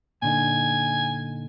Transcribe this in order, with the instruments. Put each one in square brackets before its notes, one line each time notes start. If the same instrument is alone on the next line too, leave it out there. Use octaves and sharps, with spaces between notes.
[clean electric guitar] A#2 D3 D#4 [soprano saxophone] G#5